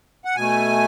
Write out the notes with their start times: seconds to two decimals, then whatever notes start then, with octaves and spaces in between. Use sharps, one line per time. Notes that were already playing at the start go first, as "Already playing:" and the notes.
0.25 F#5
0.36 B2 A3 G#5